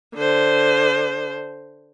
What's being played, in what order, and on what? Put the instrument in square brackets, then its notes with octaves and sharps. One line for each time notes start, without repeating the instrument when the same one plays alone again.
[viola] D3 C5